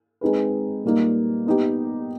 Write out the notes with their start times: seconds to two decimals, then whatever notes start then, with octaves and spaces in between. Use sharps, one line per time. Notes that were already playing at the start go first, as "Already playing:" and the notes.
0.21 G#3 C4 D#4 G#4 B4
0.84 A#2 G3 A#3 D#4
1.46 B3 D#4 G4